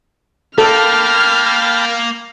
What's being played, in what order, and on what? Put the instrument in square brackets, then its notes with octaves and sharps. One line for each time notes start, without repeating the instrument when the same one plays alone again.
[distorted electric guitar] A#3 [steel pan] A4 [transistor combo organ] G5 A5 B5 [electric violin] F6